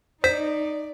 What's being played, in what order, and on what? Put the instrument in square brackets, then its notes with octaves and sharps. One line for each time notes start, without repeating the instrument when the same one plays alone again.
[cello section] D#4 [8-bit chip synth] C5 [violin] D5 [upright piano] B6